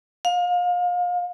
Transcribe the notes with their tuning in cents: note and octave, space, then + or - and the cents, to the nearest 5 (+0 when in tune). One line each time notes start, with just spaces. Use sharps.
F5 +30